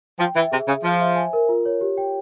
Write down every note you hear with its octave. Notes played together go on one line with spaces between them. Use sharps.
F3 G5
E3 E5
C3 G#4
C#3 G#4
F3 C5
E5
G#5
A#4
F4
C#5
G4
G5